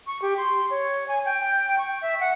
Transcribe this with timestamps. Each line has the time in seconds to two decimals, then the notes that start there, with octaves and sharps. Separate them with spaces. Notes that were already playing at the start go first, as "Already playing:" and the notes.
0.07 C#6
0.22 G4
0.37 C6
0.70 C#5
1.08 G#5
1.25 G5
1.78 C#6
2.01 E5
2.20 F#5